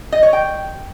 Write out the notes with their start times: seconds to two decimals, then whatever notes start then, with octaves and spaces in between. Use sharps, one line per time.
0.12 D#5
0.23 C#5
0.33 G5